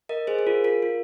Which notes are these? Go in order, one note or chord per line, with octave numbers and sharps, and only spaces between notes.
A#4 D#5
G#4 C5
G#4
F4 A#4
F4 A#4
F4